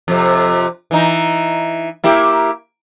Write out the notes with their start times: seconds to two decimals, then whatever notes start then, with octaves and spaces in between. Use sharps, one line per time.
0.08 F2 C3
0.91 E3 D#4
2.04 A#3 E4 G4